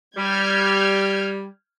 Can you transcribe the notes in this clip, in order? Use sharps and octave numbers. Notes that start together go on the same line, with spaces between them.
G3 F6 G6 G#6